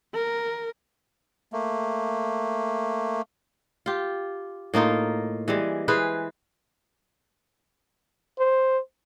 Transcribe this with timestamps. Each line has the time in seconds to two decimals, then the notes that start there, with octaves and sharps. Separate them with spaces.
0.14 A#4
1.53 A3 A#3
3.86 F4 G4
4.74 A2 A#3 D#4 F4
5.48 E3 G3 G#3
5.88 E3 G#4 B4 C5
8.39 C5